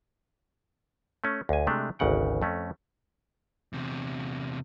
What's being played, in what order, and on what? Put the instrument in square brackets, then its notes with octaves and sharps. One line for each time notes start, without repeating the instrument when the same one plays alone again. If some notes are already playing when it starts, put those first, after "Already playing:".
[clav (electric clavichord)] A3 C#4
D2 G#5
C3 G#3 A3 D4
G#1 D2 C#3 F#5 G5
F2 A3 C#4
[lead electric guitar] E2 C3